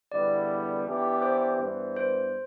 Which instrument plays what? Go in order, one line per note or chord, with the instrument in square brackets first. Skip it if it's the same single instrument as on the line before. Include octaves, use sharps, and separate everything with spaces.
[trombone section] E2 D3 G3 B3 E4 [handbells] D5
[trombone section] E3 B3 D4 G4
[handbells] C5
[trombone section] G2 E3 B3
[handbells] C5